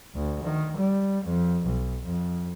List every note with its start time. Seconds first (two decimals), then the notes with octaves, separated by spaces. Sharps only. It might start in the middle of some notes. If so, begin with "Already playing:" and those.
0.15 D2
0.44 D#3
0.77 G3
1.24 F2
1.65 B1
2.05 F2